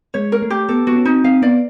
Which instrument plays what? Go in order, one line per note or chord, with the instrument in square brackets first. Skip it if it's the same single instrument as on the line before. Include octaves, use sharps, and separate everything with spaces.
[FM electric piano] G#3 [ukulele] C#5
[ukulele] A#4
[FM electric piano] A3
[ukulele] G4
[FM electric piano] B3 [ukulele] A4
[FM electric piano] B3 [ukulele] F#4
[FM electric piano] C#4
[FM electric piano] C4 [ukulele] D#4
[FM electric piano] C4 [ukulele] F5
[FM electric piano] B3 [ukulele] D5